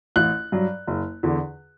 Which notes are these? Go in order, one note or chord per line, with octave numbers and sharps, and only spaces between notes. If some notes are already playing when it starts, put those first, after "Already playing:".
A1 F#6
G2 F#3
F#1
E2 D3